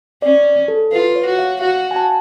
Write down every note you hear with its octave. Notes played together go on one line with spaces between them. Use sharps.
C#4 D5
A4
F4 B4
C#5
F#4
F5
F#4 F5
G#5
A5